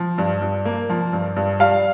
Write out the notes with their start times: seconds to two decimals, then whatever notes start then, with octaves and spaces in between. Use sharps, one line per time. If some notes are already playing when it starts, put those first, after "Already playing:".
Already playing: F3
0.18 G2
0.42 G2
0.65 A#3
0.89 F3
1.13 G2
1.36 G2
1.60 G3 F5